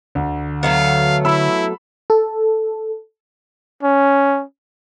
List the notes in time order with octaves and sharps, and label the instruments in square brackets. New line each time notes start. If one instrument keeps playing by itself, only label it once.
[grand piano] D2 [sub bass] D3
[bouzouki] F#3 A3 B3 [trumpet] F5
[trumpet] E4 [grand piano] B5 E6
[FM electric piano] A4
[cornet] C#4